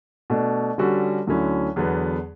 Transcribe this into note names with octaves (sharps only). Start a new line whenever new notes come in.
B2 A3 D4
D3 G3 C#4 F#4 A4
D2 D3 F#3 C#4 E4
E2 D3 F#3 B3